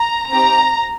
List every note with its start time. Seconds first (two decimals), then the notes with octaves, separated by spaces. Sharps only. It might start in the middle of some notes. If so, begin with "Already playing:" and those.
Already playing: A#5
0.31 C4 D#4 G4 A#5